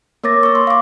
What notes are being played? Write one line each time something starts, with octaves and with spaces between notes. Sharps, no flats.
A#3 A#4 C#5 D6 A6 A#6
C#6 E6
C6
F5 D6